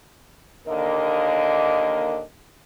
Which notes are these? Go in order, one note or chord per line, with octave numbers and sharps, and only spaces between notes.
D#2 D3 A#3 A#4 D#5